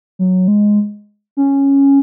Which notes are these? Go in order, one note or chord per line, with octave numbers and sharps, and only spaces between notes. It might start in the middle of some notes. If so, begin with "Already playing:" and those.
F#3
G#3
C#4